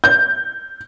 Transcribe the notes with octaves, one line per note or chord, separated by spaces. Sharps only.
G6